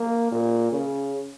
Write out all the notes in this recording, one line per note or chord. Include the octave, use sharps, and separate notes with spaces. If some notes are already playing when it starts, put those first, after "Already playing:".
Already playing: A#3
A#2
C#3